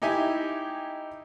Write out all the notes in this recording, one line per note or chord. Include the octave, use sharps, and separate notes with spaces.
D#4 E4 G4 E5 G#5